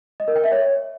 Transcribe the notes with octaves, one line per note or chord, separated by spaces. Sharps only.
D#5
A#4
G5
E5
C#5